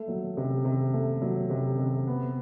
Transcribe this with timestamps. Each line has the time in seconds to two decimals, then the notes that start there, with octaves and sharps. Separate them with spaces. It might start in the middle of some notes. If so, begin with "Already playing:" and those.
Already playing: A3
0.08 F#3
0.37 C3
0.65 C3
0.94 A3
1.22 F#3
1.50 C3
1.78 C3
2.07 B3